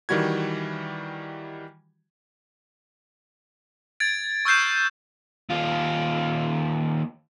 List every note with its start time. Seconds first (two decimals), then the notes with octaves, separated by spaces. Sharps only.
0.09 D#3 E3 G3 F#4 G#6
4.00 G#6 A6 D7
4.45 C#6 E6 F6 G6 C7 E7
5.49 D#2 F4